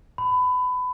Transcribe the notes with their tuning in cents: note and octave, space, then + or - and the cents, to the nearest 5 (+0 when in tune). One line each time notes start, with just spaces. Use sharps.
B5 +25